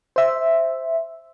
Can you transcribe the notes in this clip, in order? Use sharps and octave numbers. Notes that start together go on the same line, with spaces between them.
C5 E5